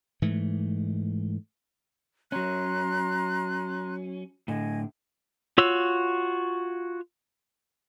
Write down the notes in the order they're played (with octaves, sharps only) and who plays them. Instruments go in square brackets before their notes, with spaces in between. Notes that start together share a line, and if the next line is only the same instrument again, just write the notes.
[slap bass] G#2 E3 A3
[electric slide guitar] F#3 C#4 [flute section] A#5 C6 F#6
[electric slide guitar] A2 D3 [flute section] D#5 G#5
[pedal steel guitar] F4 F#4 C#5 E6